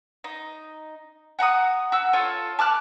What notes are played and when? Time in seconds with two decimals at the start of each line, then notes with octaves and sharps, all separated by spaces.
0.24 D#4
1.39 F#4 F#5 A#5 D#6
1.92 F#4 E6
2.13 F4 A4 C#5
2.59 A5 D6 F6 F#6